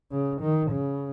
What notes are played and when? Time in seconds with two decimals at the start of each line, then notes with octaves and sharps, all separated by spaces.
0.12 C#3
0.42 D#3
0.72 C#3